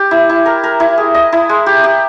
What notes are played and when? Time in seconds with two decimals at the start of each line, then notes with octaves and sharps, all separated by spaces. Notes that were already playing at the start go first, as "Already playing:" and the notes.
Already playing: G4
0.11 E4
0.30 E4
0.46 A#4
0.64 A#4
0.80 E4
0.98 G#4
1.14 D#5
1.32 E4
1.49 G#3
1.66 G4
1.84 G4